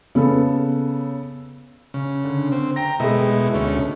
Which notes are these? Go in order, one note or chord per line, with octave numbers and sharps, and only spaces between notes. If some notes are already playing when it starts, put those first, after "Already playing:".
C#3 B3 A4
C#3
D3
C4
G5 A#5 A#6
B2 G#3 A3 E4 D#5
D2 A3 C#4